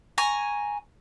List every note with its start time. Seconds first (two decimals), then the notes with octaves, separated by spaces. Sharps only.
0.18 G#5 A#5 C#6